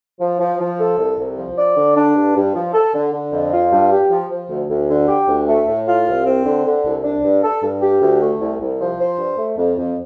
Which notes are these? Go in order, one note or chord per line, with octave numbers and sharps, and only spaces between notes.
F3
F3
F3
A4
C2
C2
F3
D5
D3
D4
G2
G2
F3
A4
D3
D3
F2
F4
G2
G4
F3
F3
D2
D2
D3
G4
D2
A3
A2
F4
C2
C4
D3
D3
C2
D4
G2
A4
G2
G4
D2
A3
C2
C2
F3
C5
G2
A3
F2
F2